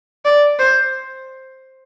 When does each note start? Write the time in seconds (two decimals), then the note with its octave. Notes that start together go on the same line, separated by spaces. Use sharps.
0.25 D5
0.59 C5